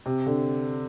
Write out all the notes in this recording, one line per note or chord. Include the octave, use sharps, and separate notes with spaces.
C3
D3